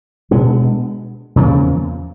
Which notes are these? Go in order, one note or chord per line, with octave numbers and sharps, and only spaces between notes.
B2 G#3 B3 D4
E2 C#3 F3 A#3